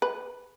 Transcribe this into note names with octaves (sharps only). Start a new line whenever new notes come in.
B4